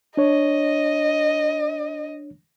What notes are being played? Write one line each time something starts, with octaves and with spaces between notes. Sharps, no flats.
D4 C#5 D#5